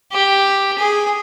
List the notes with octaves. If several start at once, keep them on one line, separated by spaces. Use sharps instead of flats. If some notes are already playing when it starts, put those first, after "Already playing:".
G4
G#4